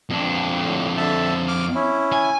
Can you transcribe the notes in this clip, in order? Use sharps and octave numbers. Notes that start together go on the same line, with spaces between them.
F2 D4
A2 D3
D3 E5 A5
D6 F6
C#4 E4
G#5